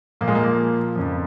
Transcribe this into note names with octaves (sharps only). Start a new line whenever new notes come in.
A#2 F3 A#3
G#3
A#3
F2 C#3 F3